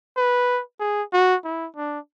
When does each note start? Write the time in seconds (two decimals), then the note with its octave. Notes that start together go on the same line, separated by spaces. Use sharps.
0.16 B4
0.80 G#4
1.13 F#4
1.44 E4
1.76 D4